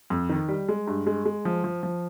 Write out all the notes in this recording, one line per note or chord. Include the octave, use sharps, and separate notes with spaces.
F2
D#3
G3
G#3
G2
G#3
G#3
F3
F3
F3